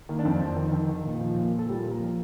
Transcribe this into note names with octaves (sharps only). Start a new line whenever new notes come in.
D#3 A#3
D4
F2 C4
F2
D#3
D#3
D#3
A#2
F3
A#2
F3
A4
A#2 G3 G4
F3
A#3 A#4
F3